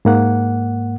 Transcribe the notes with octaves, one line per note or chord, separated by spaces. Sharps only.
G#2 A#3 F#5